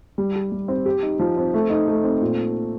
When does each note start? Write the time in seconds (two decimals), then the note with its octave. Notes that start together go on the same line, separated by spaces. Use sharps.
0.18 G3
0.35 G4
0.52 G3
0.68 C4
0.86 G4
1.03 D#4
1.19 F3
1.37 C4
1.54 A3
1.70 D#4
1.88 A3
2.04 C4
2.21 A#2